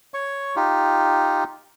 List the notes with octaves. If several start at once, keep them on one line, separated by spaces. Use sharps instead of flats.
C#5 C#6
D#4 F4 G4